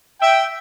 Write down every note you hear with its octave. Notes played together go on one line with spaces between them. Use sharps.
E5 G5